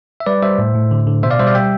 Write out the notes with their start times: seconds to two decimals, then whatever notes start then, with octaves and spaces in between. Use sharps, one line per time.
0.20 E5
0.26 G3 B4 D5
0.43 G3 C5 E5
0.59 A2
0.75 A2
0.91 D3
1.07 D3
1.23 B2 C5 E5
1.30 D5 F5
1.39 G3 C5 E5
1.47 D5 F5
1.55 G3 E5 G5